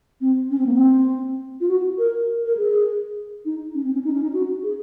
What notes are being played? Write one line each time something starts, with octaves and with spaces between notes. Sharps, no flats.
C4
C#4
C4
A#3
C4
F4
F#4
A#4
A#4
G#4
D#4
C#4
C4
C#4
D#4
C#4
D#4
F#4
G#4